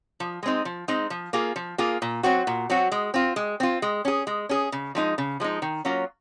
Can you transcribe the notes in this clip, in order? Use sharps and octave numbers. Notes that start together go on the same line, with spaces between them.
F3
G#3 C4 D#4
F3
G#3 C4 D#4
F3
A#3 F4 G#4
F3
A#3 F4 G#4
A#2
F#3 C4 F#4
A#2
F#3 C4 F#4
G#3
C4 F4
G#3
C4 F4
G#3
C#4 G#4
G#3
C#4 G#4
C#3
F3 G#3 D#4
C#3
F3 G#3 D#4
D#3
F#3 A#3 C#4 F4